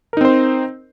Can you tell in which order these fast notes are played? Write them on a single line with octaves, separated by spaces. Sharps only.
A#4 D#4 C4 C5